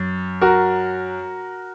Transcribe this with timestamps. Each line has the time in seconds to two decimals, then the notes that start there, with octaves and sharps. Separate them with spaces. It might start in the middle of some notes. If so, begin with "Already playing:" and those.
Already playing: F#2
0.41 F#4 A#4